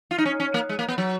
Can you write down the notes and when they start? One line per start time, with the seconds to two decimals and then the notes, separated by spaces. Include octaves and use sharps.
0.11 F4
0.18 D#4
0.25 C#4
0.40 C#4
0.54 A#3
0.69 G#3
0.79 A#3
0.89 B3
0.98 F#3